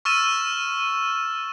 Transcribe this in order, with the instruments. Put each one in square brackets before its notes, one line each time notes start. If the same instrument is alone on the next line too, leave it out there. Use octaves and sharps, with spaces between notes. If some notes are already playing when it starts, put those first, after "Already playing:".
[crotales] C#6 E6 F6 A6 D#7 E7